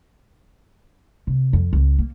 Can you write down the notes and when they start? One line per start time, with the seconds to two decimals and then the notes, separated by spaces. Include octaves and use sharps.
1.27 C3
1.53 F2
1.73 C#2
1.99 A#3